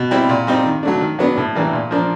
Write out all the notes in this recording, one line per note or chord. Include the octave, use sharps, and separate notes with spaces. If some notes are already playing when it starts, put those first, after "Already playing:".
Already playing: B2
G3 C4 E4
A#2
G3 C4 D#4
D#3
F#3 A3 D4
D#3
F#3 B3 D4
A2
E3 G3 A#3 D4
A#2
F3 A#3 D4